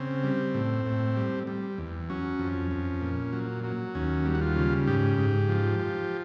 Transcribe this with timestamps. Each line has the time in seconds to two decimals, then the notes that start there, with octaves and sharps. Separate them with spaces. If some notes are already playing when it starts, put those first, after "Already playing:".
Already playing: C#3 C4
0.24 G3
0.54 A2
0.86 A2
1.16 G3
1.47 G3
1.78 E2
2.09 F#3 C#4
2.39 F2
2.71 F2
3.01 A#2
3.33 F#3
3.64 F#3
3.95 D#2 C#4
4.25 G3
4.35 F#4
4.41 F4
4.56 C#3
4.87 G#2 G4
5.18 G#2
5.49 F3
5.79 F3